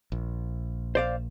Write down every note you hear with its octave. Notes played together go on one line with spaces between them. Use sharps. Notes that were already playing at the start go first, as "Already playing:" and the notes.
A#1
C5 D5 F5